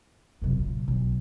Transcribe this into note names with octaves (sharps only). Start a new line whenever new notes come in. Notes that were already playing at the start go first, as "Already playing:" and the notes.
F#2 C3
A#2
B1